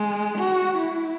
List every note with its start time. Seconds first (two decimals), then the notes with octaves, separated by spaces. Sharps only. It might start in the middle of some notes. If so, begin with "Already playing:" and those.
Already playing: G#3
0.38 F#4
0.78 E4